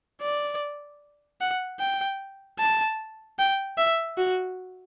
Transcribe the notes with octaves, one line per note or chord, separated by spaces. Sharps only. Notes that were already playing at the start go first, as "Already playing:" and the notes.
D5
F#5
G5
A5
G5
E5
F#4